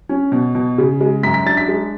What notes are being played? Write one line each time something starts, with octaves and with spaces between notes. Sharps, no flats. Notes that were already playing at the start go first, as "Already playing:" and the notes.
C#4
B2
B2
C#3
G#3
F#2 B6
B6
D4 A6
B6
G#3